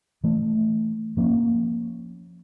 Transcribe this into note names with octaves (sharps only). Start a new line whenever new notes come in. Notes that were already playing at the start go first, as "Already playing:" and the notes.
E3 A3
F3 A#3 C4 C#4